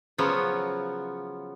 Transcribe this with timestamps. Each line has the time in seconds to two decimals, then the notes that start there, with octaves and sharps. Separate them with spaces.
0.18 C#3 F3 F#3 B3 C#5